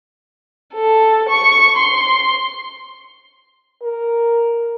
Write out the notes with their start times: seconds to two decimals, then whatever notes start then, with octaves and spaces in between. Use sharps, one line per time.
0.74 A4
1.29 C#6
1.77 C6
3.83 A#4